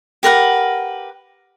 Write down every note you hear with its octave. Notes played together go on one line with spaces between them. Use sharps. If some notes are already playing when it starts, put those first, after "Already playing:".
G4 A#4 B4 F#5